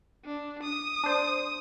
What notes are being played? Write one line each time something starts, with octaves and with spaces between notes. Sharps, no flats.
D4
D#6
D4 C5